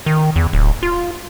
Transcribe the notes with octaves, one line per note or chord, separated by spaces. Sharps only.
D#3
E2
D1
F4